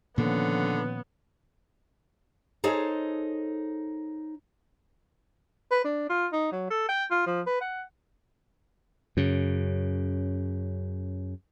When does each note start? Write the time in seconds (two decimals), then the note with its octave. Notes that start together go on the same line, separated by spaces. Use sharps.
0.18 A#2 D3 D#3 F3 A#3 B3 C#4
2.64 D#4 G#4 A4 C5 C#5 D#5
5.71 B4
5.84 D4
6.09 F4
6.32 D#4
6.52 F#3
6.70 A4
6.89 G5
7.11 F4
7.26 F3
7.46 B4
7.61 F#5
9.17 F#2 C#3